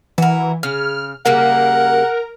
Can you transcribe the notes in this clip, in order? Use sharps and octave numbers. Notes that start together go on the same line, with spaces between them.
E3 F#4 A#4
C#3 F6
C#3 G3 A#3 A#4 F#5